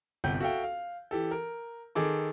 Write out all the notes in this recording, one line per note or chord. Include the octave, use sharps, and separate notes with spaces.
G1 C2 F#5 G5 G6
F#4 A4 E5 F5 G5
F5
E3 G4 A4
A#4
D#3 G#4 A4 D6